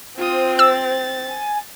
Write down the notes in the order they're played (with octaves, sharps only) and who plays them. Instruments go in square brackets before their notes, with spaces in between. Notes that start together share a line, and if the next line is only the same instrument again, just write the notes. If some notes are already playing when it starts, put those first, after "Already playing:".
[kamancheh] C4 [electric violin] F4 D#6 [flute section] C5
[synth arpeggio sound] E6 [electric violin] A6
[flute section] G#5